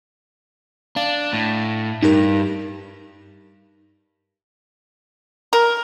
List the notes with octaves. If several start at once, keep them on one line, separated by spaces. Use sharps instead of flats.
D4 F5
A2
G2 D#4 G4 A#4
A#4